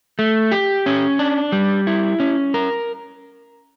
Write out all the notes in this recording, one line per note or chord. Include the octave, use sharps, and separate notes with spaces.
A3
G4
C#4
D4
G3
E4
C#4
A#4